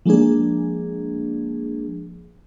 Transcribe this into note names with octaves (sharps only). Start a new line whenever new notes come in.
F3 G#3 A#3 D4 G#4